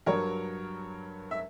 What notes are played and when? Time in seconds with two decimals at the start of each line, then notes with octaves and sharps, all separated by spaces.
0.06 G2 F#3 A#4 C#5
1.31 E5